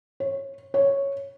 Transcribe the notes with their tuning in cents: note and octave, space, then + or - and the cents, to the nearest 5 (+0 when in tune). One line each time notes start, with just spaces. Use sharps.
C#5 -20
C#5 -5